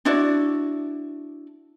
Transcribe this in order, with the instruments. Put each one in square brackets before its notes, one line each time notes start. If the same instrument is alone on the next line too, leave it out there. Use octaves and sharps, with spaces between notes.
[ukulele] D4 E4 F#4 D5